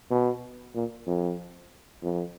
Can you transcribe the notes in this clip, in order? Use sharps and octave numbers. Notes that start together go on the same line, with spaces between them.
B2
A#2
F2
F2